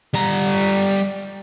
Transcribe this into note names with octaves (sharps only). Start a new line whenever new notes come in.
G3 A#5